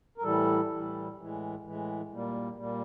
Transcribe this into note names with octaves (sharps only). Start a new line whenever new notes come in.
A#4
A2 E3 G3 A4
A2 E3 G3
A2 E3 G#3
A2 E3 G#3
A#2 G3 A#3
A#2 G3 A#3